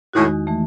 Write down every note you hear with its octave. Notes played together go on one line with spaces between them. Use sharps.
E2 A2 D#3 G#3 D#4 F#4
E3 A3